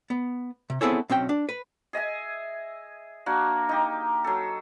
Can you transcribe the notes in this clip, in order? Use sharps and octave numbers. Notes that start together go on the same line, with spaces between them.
B3
C3
B3 C4 E4 G#4 A4 C#5
B1 C4 C#4 G5
D4
B4
G#4 D#5 E5 G#5
A#3 D4 F#4
D#4 G4
F#3 A4